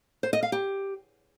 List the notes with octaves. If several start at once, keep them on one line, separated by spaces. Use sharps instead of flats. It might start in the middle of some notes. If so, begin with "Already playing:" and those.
C5
D#5
F5
G4